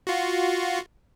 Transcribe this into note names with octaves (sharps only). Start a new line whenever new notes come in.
F4 F#4